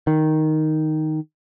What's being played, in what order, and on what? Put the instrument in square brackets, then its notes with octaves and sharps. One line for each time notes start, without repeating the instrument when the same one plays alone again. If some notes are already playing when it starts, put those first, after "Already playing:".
[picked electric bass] D#3